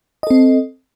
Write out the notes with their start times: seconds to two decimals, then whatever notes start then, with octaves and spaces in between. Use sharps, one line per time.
0.23 D#5
0.27 A4
0.30 C4